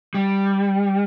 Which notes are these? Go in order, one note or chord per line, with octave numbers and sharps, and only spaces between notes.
G3